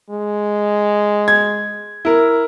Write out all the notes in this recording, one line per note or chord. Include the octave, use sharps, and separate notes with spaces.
G#3
G#6
E4 A#4